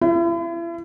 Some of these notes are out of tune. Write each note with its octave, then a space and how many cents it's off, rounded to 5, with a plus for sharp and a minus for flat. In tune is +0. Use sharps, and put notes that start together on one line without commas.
E4 +40